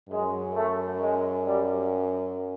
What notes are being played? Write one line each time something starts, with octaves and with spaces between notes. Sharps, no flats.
F#2 G#3
A3
G#3
G3